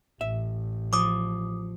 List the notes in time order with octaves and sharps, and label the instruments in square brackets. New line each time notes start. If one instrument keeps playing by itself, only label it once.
[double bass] A1 [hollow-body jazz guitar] E5
[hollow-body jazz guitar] F3 [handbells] D6 D#6